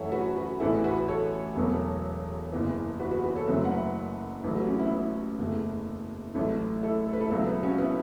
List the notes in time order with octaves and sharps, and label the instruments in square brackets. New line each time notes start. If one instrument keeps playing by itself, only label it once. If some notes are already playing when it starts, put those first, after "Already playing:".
Already playing: [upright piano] F#2 E3 A3 A4 C#5 E5 F#5
F#4 B4
F#4 B4
A1 A2 E3 B3 E4 A4
F#4 B4
A4 C#5
E1 E2 B2 F#3 B3
F#1 E2 E3 B3
F#4 B4
F#4 B4
F#4 B4
A4 C#5
F#1 F#2 F#3 A3 B4 E5
F#5
B4 E5
A1 A2 F#3 A3 B4 E5
F#4 B4
C#4 F#4
B3 E4
B3 E4
F#1 E2 C#3 A3
A1 A2 F#3 A3
E4 A4
A4
B4
E4 A4
C#2 B2 F#3 B3 E4 A4
B3 E4
C#4 F#4
B3 E4